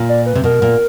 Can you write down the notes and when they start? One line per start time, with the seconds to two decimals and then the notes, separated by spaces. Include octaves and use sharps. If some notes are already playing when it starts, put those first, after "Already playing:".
Already playing: A#2
0.09 D5
0.26 B4
0.35 C3
0.44 B2 A#4
0.62 A#2